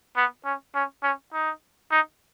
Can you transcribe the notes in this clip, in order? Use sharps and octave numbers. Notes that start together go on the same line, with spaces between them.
B3
C#4
C#4
C#4
D#4
D#4